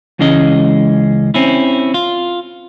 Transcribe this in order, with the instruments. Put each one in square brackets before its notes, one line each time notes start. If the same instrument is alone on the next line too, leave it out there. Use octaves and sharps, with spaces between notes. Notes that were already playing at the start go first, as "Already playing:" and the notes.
[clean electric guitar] C#2 E3 G#3 C#4 D#5
C4 C#4 E4
F4